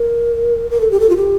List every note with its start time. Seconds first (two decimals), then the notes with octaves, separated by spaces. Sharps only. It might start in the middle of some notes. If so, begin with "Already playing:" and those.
Already playing: A#4
0.71 A#4
0.80 A4
0.91 G4
1.00 A4
1.10 F4
1.17 G4